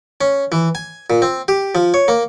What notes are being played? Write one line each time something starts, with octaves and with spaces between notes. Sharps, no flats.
C#4
E3
G#5
A#2
C4
G4
F3
C#5
A#3